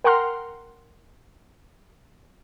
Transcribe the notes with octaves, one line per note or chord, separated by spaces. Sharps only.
A#4 F#5 G5 A#5 C6 F6